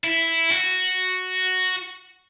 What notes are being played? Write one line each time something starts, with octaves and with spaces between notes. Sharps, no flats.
E4
F#4